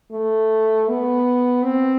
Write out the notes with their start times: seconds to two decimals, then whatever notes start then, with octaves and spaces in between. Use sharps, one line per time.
0.12 A3
0.88 B3
1.63 C4